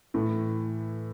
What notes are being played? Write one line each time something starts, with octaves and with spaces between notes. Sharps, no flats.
A2 E3 A3